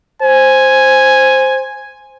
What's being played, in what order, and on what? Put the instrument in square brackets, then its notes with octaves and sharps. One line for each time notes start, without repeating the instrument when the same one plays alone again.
[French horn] C5 [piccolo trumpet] G#5